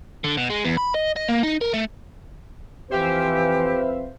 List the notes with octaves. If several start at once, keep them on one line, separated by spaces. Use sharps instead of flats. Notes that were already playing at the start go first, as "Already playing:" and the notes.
D3
B2
G#3
E2
B5
D#5
D#5
A#3
D#4
A#4
A3
F2 E3 C4 G4 B4 C5 E5 F5